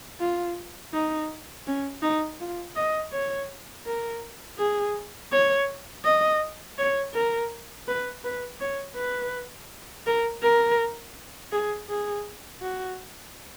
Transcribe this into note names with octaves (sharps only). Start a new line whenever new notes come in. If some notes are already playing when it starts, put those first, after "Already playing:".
F4
D#4
C#4
D#4
F4
D#5
C#5
A#4
G#4
C#5
D#5
C#5
A#4
B4
B4
C#5
B4
A#4
A#4
G#4
G#4
F#4